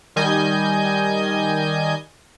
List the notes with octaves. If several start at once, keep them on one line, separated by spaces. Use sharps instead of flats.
D#3 G3 D#5 G#5 G6